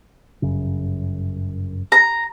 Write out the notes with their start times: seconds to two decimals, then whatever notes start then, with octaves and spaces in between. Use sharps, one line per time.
0.42 G1 F#2 C#3
1.92 A#5